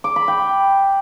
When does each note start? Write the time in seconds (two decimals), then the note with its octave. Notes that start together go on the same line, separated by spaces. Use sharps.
0.04 D6
0.16 B5
0.28 G5